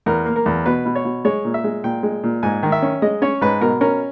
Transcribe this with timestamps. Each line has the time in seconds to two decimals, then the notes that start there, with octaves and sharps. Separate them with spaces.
0.06 E2 A#4
0.26 A#3
0.36 A#4
0.46 E2
0.66 B2 B4
0.85 B2
0.95 C#5
1.05 B2
1.25 G#3 C#5
1.45 A#2
1.54 E5
1.64 G#3
1.84 A#2 G5
2.03 G#3
2.23 A#2
2.43 G#2 G#5
2.63 D#3
2.72 E5
2.82 C#4
3.02 G#3 D#5
3.22 C#4 C#5
3.41 G#2 B4
3.61 B2 A#4
3.81 C#4 A#4